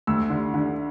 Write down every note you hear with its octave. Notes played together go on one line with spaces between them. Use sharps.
D2 E6
D3
D3